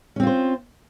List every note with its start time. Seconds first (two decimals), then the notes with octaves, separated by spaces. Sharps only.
0.16 C#4
0.20 C4
0.23 F4
0.27 C5